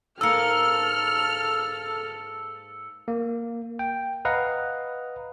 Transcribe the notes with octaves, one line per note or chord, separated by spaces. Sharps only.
G#2 A#3 A4 E6 F6 C#7
A#3
G5
B4 D#5 F5 F#5 A#5